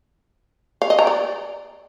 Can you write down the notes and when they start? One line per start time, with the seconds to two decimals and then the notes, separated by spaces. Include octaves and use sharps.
0.82 F5
0.90 D#5
0.99 A#5
1.07 D5